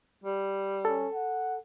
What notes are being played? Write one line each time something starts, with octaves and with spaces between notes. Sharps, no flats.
G3
C#4 A4
F#5